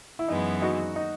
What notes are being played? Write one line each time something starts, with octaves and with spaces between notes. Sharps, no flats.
E4
F#2 E3 G#3 B3 D#4
D#4 F#4
D#4